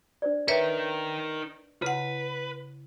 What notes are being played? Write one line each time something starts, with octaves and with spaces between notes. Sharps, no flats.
D4 C5 D5
D#4 A#4 B4 C#5 E5
C#3 E4 B4 F#5